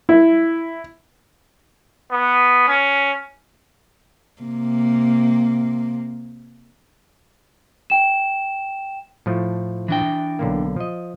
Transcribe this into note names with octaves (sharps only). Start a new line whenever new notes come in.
E4
B3
C#4
C3 A#3
G5 E7
A2 F3 A3
E3 D4 G5
B1 D3 A#3
F3 D#5